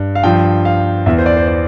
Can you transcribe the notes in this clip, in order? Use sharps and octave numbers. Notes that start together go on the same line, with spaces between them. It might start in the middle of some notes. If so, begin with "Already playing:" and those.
Already playing: G2
F5
G2 F3 G5
F5
E2 E3 E5
C5
D5
C5
D5